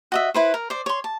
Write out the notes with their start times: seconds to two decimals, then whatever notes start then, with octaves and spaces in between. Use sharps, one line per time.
0.12 F#4 D#5 E5
0.34 E4 B4 C5
0.54 A#4
0.70 C5 D5
0.86 C#5 C6
1.04 A5